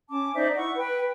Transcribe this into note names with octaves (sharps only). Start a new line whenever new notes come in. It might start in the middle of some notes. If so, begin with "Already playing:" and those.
C#4 A5 D6
D#4 C5 D5 E5
E4 F#5 C#6
B4 G5